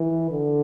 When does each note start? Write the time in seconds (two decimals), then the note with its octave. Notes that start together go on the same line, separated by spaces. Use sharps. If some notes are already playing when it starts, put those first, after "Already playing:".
Already playing: E3
0.31 D3